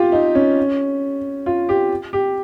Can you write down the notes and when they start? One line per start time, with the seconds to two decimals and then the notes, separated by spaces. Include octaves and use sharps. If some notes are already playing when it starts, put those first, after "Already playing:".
Already playing: F4 G4
0.12 D#4
0.35 C#4
1.46 F4
1.69 G4
2.13 G4